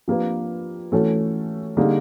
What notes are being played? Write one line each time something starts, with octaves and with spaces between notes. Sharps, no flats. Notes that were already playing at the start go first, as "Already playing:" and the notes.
F3 A#3 D4 G4 B4
E3 A3 C#4 F#4 A4
D3 G3 A#3 D#4 G#4